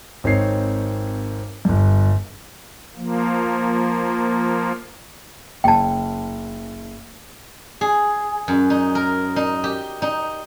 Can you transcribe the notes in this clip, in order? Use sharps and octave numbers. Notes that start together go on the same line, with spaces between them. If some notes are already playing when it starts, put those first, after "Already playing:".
G#1 C4 D#4 C#5 C7
G1 G2
F3 A#3
F#1 G5 A5
G#4
F#2
D#4
A#4
D#4
G4
D#4